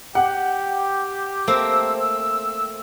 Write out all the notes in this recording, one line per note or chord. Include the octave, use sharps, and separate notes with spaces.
G4 F#5
A3 A#3 C4 E6